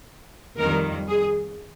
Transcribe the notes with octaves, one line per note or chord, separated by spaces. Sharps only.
F2 D#3 G3 A#4
G#4